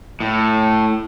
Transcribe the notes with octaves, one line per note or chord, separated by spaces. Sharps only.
A2